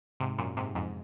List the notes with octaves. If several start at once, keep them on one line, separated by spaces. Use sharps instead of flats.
G#2 C3
F#2 A#2
G#2 C3
F2 G#2